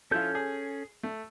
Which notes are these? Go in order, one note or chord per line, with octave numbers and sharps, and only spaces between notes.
F3 C#4 E4 F4 A4 G6
G#4
A3